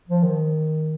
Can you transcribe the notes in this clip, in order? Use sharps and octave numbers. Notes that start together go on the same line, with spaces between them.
F3
D#3